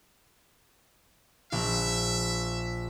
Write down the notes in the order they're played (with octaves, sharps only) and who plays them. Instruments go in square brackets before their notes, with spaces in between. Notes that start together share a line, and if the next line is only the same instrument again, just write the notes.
[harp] A#1 [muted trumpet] E5